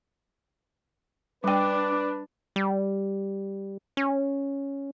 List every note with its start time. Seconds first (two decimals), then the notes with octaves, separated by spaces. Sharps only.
1.44 G3 D4 B4 G5 D6
2.56 G3
3.97 C#4